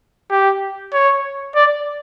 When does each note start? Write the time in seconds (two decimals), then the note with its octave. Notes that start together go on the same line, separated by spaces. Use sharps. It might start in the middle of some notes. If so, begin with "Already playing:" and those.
0.31 G4
0.93 C#5
1.55 D5